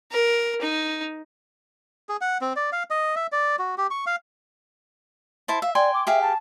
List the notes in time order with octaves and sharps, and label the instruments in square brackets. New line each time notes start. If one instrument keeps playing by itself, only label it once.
[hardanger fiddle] A#4
D#4
[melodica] G#4
F#5
C4
D5
F5
D#5
E5
D5
F#4
G4
C#6
F5
[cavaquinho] E4 C5 A5
[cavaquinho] E5 [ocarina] F5
[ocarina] D5 [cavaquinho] G5 G#5 C6
[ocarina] D6
[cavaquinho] G4 G#4 F5 [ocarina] E5
[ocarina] A5